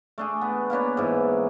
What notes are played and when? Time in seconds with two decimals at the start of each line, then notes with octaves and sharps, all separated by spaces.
0.18 A3 D4 G#4
0.41 B3
0.70 A#3 B3 D4 C#5
0.97 G#2 E3